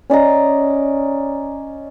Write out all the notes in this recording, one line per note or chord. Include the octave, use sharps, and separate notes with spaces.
C#4 D5 D#5 A#5